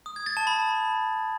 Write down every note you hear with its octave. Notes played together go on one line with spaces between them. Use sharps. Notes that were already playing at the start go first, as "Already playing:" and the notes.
D#6
G#6
A6
A5
B5